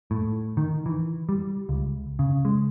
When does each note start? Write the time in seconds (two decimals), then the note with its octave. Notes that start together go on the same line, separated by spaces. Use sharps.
0.11 A2
0.57 D#3
0.86 E3
1.29 G3
1.69 C#2
2.19 C#3
2.45 G#3